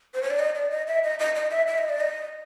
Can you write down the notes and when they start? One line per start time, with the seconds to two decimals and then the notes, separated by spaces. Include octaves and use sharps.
0.14 C5
0.23 C#5
0.31 D5
0.39 D#5
0.55 D5
0.71 D#5
0.88 E5
1.04 D#5
1.19 D#5
1.35 D#5
1.51 E5
1.67 E5
1.78 D#5
1.89 D5
2.00 D#5